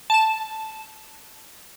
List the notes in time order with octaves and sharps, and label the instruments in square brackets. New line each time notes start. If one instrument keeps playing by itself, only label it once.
[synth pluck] A5 E7